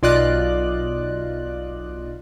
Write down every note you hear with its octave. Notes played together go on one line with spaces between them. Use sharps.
B1 F4 D5 D#5 F#6